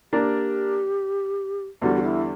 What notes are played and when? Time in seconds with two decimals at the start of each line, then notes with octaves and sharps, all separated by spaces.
0.12 A#3 D4 G4 A#4 D5
1.82 E2 D3 G3 F#4
1.96 F#4
2.03 E4